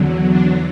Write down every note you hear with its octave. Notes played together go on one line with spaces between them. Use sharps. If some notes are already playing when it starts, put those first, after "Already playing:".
Already playing: E2 D3 F#3
D4